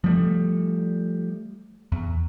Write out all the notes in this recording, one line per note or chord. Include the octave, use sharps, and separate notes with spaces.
F3 G3 A3
E2